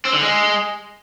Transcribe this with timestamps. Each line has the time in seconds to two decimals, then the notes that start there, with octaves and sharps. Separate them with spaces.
0.05 C4
0.13 D3
0.22 G#3